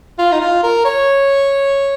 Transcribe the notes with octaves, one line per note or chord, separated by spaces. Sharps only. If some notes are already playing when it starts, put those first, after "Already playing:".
F4
D#4
F4
A#4
C#5